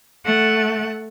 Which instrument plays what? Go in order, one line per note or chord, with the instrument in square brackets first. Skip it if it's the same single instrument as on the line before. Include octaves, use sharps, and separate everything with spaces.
[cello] A3 F#5